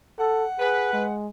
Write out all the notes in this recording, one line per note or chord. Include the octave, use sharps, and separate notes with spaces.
A4 F#5
G#4 B4
G#3